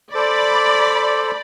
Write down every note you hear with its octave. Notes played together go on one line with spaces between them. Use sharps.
A4 C5 D5 B5